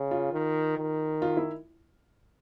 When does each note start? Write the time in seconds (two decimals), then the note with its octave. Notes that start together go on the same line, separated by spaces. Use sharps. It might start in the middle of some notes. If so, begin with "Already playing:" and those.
Already playing: C#3
0.11 F4
0.33 D#3
0.77 D#3
1.22 F4
1.37 E4